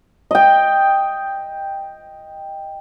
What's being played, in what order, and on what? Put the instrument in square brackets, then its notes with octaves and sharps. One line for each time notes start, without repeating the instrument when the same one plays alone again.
[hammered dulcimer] D#5 G5